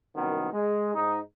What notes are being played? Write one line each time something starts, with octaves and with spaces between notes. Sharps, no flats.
C2 F#2 D#3 B3
G#3
G#2 D#4